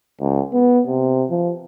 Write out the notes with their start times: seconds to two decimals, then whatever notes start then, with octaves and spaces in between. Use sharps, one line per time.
0.21 C#2
0.53 B3
0.87 C3
1.30 F3